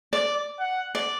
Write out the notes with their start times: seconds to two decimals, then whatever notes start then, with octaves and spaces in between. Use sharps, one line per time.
0.13 D5
0.59 F#5
0.95 D5